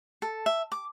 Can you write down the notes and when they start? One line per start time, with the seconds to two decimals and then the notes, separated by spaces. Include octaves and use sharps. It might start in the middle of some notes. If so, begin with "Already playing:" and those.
0.22 A4
0.46 E5
0.72 D6